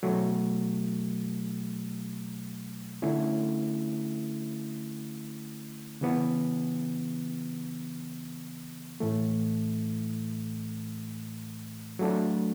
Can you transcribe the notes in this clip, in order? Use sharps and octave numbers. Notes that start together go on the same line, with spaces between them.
B2 F#3 A3
D3 A3 C#4 E4
C#3 E3 B3
A2 E3 A3
F#3 A3 D4